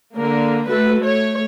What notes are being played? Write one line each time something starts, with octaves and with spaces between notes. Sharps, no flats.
D3 A#3 A#4
A3 F#4 A4 B4
A3 C#5